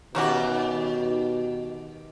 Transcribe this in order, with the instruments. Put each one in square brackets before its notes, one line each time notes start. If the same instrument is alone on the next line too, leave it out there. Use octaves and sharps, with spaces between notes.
[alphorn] B2 [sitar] D#3 G4 [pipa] A#3 C#4 F#4